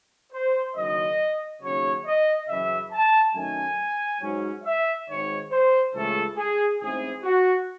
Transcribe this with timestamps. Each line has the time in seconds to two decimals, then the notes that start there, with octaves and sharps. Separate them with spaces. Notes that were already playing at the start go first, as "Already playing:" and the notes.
0.32 C5
0.76 F#1 F#2 D#3 D#5
1.62 D#2 C#3 F#3 C#4 C#5
2.06 D#5
2.48 F#2 C#3 E3 E5
2.92 A5
3.35 F#2 D#3 A3 C#4 G#5
4.21 G#2 F#3 C#4
4.64 E5
5.08 G#1 G#2 D#3 C#5
5.51 C5
5.94 C#2 C#3 E3 A3 C#4 A4
6.37 G#4
6.80 A1 G#2 E3 C4 G#4
7.23 F#4